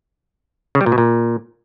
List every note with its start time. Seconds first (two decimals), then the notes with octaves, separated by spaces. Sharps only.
0.75 C#3
0.81 G3
0.86 A#2
0.92 B2
0.98 A#2